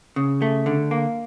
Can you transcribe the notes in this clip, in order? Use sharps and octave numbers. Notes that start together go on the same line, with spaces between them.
C#3
A3
D3
A#3